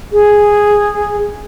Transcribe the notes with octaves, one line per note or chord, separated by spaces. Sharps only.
G#4